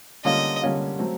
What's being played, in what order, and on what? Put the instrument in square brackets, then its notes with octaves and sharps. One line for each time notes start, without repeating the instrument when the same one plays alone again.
[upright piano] D3 G3 A#3 C#4 F4 [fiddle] D#5
[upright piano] D3 G3 A#3 C#4 F4
F#3 A3 C4